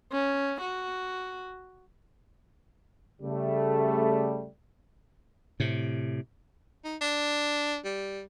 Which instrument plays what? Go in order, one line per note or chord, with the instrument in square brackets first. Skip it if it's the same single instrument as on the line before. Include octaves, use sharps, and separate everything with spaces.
[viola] C#4
F#4
[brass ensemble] C#3 G3 A3
[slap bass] A2 C3
[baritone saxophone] D#4
D4
G3